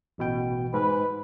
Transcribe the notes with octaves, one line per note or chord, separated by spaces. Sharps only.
A1 B2 G5
G#2 B4